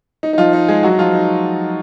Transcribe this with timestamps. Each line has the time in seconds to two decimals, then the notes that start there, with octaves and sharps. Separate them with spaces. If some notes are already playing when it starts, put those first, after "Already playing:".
0.23 D#4
0.33 D#4
0.38 F3 F4
0.53 D#4
0.68 G#3 G#4
0.83 F#3 F#4
0.92 D#4
0.99 F3 F4
1.14 D#4